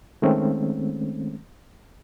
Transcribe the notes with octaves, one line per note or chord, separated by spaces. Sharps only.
D#3 G#3 A3 C4 C#4